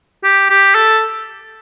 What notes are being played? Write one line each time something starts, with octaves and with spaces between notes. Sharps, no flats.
G4
G4
A4